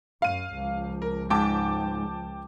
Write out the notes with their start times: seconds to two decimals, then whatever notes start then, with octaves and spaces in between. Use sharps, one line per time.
0.22 F#2 F5 D#7
0.55 C#2 F3
1.02 A#4
1.30 G#2 G5 A5 D6